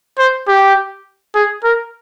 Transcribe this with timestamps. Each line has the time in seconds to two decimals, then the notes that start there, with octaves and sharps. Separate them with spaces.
0.18 C5
0.48 G4
1.35 G#4
1.64 A#4